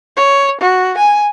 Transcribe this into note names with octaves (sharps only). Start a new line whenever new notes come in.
C#5
F#4
G#5